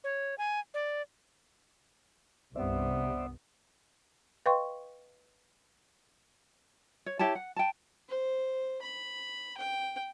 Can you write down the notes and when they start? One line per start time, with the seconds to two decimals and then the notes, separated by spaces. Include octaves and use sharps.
0.04 C#5
0.38 G#5
0.74 D5
2.56 C2 G2 C3 B3 C5 D5 E5
4.46 B4 D#5 F5 G5 C6 C#6
7.06 C#5
7.19 E4 G4 C#5 A5
7.35 F#5
7.56 G5 A5
8.08 C5
8.82 B5
9.57 G5